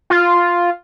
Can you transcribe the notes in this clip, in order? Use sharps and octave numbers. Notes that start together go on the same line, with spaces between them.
F4